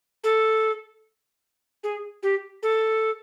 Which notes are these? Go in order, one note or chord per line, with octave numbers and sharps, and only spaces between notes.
A4
G#4
G4
A4